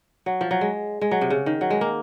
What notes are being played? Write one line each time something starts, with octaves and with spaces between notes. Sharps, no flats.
F#3
F3
F#3
G#3
G#3
F#3
C3
C#3
D#3
F#3
G#3
A#3